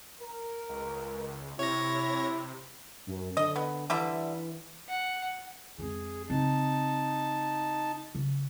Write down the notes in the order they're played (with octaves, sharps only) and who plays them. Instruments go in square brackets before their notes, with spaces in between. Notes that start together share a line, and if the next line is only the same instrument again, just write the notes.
[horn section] A#4
[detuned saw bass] C#2
[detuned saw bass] C3 [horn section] E4 [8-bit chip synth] C#5 A#6
[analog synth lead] F#2
[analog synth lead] D3 [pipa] D#5
[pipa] B3
[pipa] D3 G3 E5 [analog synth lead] E3
[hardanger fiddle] F#5
[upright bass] F2 G#3 [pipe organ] G#4
[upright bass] C#3 C4 [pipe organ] D#4 A5
[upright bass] C#3